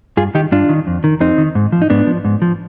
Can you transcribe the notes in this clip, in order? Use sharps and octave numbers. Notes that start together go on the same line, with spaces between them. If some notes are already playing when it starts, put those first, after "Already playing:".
G2 F4 G#4
D#3 D#4 G4
G2 D4 F4
D#3
F2
D#3
F2 C4 D#4
D#3
G#2
F3
D#4
G#2 B3 D4
F3
G#2
F3